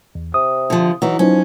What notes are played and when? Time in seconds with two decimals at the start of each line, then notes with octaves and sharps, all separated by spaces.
0.15 E2
0.34 C3 D#6
0.70 D3 F3
1.02 E3 F#3 D#4
1.19 F3 F#3 C#4 D#4